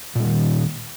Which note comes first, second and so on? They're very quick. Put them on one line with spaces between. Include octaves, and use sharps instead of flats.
A#2 G3 D#3